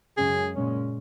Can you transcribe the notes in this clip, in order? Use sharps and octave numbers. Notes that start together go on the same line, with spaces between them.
F#2 C#3 G#3 C#4 G#4
A#2 G#3 C#4